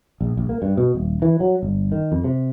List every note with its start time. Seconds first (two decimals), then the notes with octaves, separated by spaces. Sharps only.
0.21 A#1
0.37 A#1
0.49 A#3
0.62 G2
0.77 B2
0.95 D#1
1.22 E3
1.40 F#3
1.63 G1
1.92 D#3
2.12 F2
2.24 C3